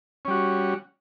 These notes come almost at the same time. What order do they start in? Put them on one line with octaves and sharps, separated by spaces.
C#4 G3 F#4